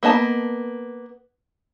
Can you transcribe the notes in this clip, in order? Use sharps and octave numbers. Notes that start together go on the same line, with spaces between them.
A#3 B3 D#5 A5